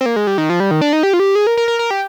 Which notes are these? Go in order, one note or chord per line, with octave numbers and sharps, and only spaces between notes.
C4
A#3
G#3
G3
D#3
F3
G3
D#3
D4
D#4
G4
F4
G4
G#4
A#4
A#4
A#4
A#4
G4